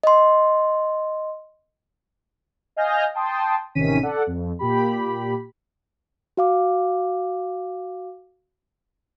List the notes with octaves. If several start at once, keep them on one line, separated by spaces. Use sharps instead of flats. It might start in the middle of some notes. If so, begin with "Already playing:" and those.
D#5 C6
D#5 F5 G#5 F6 G6 A#6
G5 A5 C6 D#6
A1 C3 D#3 C#4 B6 D#7
A4 D5 F#5
F2
A#2 G4 B5
F#4 F5 D6